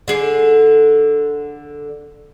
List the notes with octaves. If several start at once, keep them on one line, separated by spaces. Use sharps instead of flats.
D3 G#4 D5